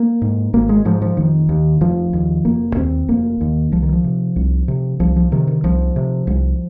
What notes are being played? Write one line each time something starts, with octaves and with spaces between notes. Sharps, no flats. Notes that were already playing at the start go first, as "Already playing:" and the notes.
Already playing: A#3
G#2
G#1 A#3
G#3
G#2 F3
F3
F1 D#3
D#2
F1 F3
D#2
F1 A#3
D#2 C4
F1 A#3
D#2
C2 F3
D#3
F3
C3
C2
C3
C2 F3
F3
C3 D#3
D#3
C2 F3
C3
C2